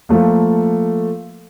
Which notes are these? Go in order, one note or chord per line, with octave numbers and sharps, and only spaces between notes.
F3 A3 A#3